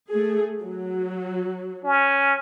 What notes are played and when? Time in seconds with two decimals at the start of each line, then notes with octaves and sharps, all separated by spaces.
0.12 A3 G#4
0.60 F#3
1.85 C#4